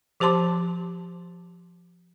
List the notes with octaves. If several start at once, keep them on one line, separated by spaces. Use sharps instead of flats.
F3 G4 C5 A5 C6 D6